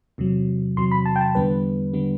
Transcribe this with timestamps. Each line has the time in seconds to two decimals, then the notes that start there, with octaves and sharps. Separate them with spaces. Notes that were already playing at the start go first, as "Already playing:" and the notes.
0.18 E2 C3 F#3
0.77 E2 C3 F#3 C6
0.91 B5
1.06 A5
1.16 G5
1.21 A5
1.35 E2 D3 G3 B3 B4
1.93 D3 G3 B3